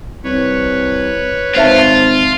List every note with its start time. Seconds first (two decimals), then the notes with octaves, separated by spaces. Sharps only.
0.24 C2 B4 C#5
1.55 G#1 F4 C5 E5 A5